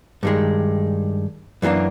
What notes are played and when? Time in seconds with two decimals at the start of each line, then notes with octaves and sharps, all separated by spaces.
0.23 G2 D#3 G#3
1.62 F#2 E3 G#3 A#3 D4